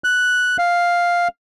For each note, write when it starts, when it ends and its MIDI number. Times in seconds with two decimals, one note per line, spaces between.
0.04 0.57 90
0.58 1.28 77